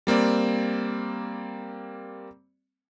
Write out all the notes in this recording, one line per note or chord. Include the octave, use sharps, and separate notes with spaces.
G3 A#3 C4 D5